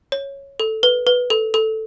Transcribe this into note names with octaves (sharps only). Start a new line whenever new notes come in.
C#5
A4
B4
B4
A4
A4